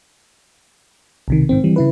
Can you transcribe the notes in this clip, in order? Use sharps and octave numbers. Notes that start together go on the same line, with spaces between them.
B1 C3 D#3
G#2 D#3 C4
E3 G3
C#3 E4 B4